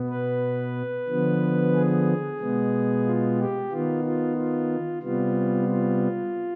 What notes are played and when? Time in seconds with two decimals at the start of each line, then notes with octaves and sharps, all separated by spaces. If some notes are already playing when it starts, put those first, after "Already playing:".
Already playing: B2 B3
0.10 B4
1.08 D3 F3 B3
1.74 G#4
2.40 B2 G#3 B3
3.05 F4
3.39 G4
3.71 D#3 B3 F4
4.05 F4
4.37 F4
5.02 C3 G3 B3 F4
5.69 F4